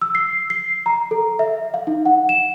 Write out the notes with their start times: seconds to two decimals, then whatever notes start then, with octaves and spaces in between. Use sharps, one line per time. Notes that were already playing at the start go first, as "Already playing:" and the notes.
0.02 E6
0.15 C7
0.50 C7
0.86 A#5
1.11 A4
1.39 E5
1.74 F5
1.87 D#4
2.05 F#5
2.29 E7